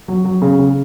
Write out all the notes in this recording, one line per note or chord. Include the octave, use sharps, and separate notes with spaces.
F#3
F#3
C#3
C#3